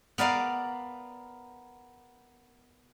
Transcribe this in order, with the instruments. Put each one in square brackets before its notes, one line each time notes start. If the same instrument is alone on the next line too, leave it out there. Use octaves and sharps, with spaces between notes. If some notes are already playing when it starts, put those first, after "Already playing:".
[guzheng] B3 A#4 D5 F5